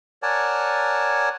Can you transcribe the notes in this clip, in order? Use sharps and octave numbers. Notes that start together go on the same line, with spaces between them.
A#4 C#5 D5 F#5 G#5 A5